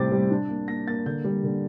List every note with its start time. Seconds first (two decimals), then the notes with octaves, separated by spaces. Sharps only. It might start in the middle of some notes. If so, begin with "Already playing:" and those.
Already playing: A2 C3 G3 C4 D6 A6
0.12 G3
0.30 D4
0.49 A#3
0.68 A#3 A#6
0.87 A#3 A6
1.06 D3 G6
1.24 G3
1.44 D3